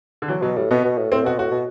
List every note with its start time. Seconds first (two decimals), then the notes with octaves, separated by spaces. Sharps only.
0.22 D3
0.28 E3 F#3
0.42 B2 F#3
0.56 A2 G3
0.70 B2 B3
0.84 B2
0.98 A2
1.12 A2 C4
1.25 B2 F#4
1.38 A2 F#4
1.51 B2